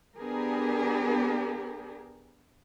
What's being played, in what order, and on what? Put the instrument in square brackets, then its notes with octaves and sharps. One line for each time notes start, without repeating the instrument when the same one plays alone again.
[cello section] B3 D4 G4 G#4 A#4